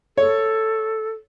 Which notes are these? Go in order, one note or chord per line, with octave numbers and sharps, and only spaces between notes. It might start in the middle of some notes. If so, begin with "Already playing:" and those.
A4 C#5